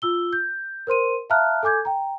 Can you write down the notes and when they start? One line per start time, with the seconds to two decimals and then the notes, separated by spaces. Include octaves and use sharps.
0.02 F4 E6 G7
0.33 G6
0.87 A#4 C5 C6 D#7
1.30 E5 F5 A5 A#5 F6 F#6
1.63 A4 G#5 D6 G6 G#6
1.85 G5 A#5